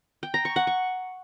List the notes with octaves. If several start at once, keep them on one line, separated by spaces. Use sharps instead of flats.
G5
A#5
C#6
F#5
C#6